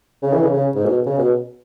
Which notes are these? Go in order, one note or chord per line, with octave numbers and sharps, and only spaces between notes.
C#3
E3
C#3
C#3
G#2
B2
C#3
B2